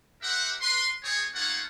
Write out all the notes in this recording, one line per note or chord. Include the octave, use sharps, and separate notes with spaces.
G4 A#4 C5 E5 F#5
B4 C6
C4 G#4 C#5
A3 A#3 D#4 F4 C#5 F#5